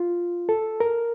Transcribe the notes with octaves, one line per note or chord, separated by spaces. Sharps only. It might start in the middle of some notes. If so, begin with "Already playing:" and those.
Already playing: F4
A4
A#4